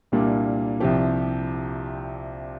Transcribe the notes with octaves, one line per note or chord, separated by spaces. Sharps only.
C2 A#2 G3 A#3 D4
C2 C3 F3 G4